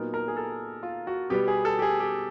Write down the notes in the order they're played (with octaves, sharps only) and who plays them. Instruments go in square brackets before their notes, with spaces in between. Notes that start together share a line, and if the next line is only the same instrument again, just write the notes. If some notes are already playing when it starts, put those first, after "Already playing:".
Already playing: [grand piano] A#2 F#3 B3 D#4 A#4
A#4
G#4
A4
F4
F#4
B2 G3 B3 G4
G#4
A4
G4
G#4
G4